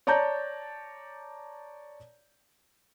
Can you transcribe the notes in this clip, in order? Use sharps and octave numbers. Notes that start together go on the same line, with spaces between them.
C#5 D5 A5 A#5 G6